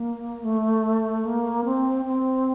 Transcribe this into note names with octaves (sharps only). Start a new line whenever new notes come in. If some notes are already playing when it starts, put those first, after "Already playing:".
Already playing: A#3
A3
A#3
C4
C4